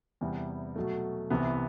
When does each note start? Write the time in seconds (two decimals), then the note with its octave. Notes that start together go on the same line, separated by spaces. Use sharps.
0.21 E2 C3 E3 G3 B3
0.76 B2 F#3 A3
1.30 C2 C3 E3 B3